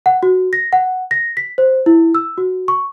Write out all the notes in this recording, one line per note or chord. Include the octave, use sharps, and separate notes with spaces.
F#5
F#4
A#6
F#5
A#6
B6
C5
E4
E6
F#4
C#6